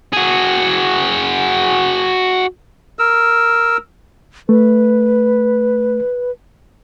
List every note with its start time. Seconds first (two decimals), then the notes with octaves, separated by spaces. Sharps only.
0.13 F#4 G#4
2.99 A#4 E6
4.49 A3 B4